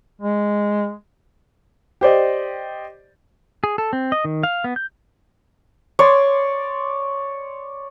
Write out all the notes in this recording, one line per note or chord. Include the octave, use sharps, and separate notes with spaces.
G#3
G4 C5 D5 D#5
G#4
A4
C4
D#5
D#3
F5
B3
G6
C#5 D5 C6